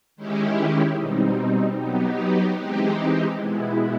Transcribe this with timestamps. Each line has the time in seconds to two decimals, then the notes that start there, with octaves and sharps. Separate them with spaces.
0.16 D#3 G#3 C#4 E4 G4
0.97 B2 G3 C4 D#4
1.77 F#3 B3 D#4 G4
2.58 E3 G#3 C4 D#4 G4
3.38 B2 G#3 B3 E4